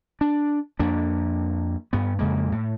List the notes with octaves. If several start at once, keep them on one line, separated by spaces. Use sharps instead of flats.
D4
F2 A#3 D4
G2 B3
F2 C#3 G#3 A#3
A2